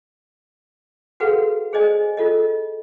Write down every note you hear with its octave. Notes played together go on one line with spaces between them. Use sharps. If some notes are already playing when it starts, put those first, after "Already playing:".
F#4 G#4 A4 B4 F5 F#5
G#4 C5 D5 D#5 G#5
F4 A4 D#5